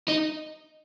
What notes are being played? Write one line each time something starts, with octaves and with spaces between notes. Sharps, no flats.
D#4